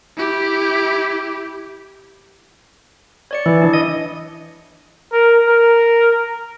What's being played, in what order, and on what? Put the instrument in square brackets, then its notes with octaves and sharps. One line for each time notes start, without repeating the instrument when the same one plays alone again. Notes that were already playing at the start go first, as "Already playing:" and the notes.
[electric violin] E4 G4
[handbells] C#5 D5 C#7
[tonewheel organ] E3 [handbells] E4 D6
[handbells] D4
[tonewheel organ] D#5
[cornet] A#4
A#4